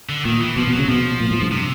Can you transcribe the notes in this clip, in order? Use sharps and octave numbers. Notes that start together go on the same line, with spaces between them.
D3
A#2 D#3
E3
B2 F3
B2
F#3
C#3
B2 F3
A#2
A2
G2
C3